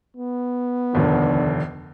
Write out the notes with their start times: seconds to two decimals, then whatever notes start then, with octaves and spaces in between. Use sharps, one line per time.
0.17 B3
0.93 F1 D#2 D3 D#3